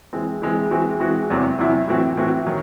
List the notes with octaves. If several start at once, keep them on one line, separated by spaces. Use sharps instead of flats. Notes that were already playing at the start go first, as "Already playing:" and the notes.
E3 G#3 C4
E3 G#3 C4
E3 G#3 C4 F#4
E3 G#3 C4 F#4
E2 C3 F#3 C4 E4
E2 C3 F#3 C4 E4
A2 E3 C4 F#4
A2 E3 C4 F#4
D#3 F#3